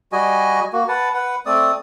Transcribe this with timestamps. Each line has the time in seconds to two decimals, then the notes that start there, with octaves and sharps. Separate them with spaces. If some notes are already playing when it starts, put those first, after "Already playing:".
0.12 G3 F#4 D#5 G#5
0.73 A#3 F#4
0.88 B4 F#5 A5
1.14 B4 F#5
1.46 A3 C4 D5 D#6